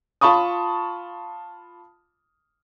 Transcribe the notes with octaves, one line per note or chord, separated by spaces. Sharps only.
F4 A5 B5 C#6 D#6